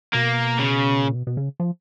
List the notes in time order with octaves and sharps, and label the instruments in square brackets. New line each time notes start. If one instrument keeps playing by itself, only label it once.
[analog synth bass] B2 [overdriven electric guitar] A#3
[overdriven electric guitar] C#3
[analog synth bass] A#2
B2
B2
C#3
F3